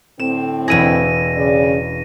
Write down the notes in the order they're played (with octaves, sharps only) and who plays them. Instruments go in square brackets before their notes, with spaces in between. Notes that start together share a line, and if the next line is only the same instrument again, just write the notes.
[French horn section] A2 D3 C4 [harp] E7
[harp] E1 E4 G#4 [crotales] A#6 D#7
[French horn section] C#3 D5